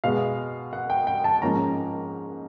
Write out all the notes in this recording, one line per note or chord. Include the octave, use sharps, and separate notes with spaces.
B2 G#3 B3 F5
F#5
G5
G5
A5
G#2 F3 A#3 C#4 A#5